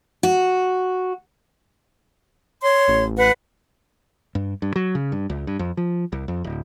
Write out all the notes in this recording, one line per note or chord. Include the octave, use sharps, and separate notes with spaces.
F#4
C#5 C6
A1
B4 F#5
G2
G2
F#3
C#3
G2
C#2
G2
F2
F3
C2
F2
D1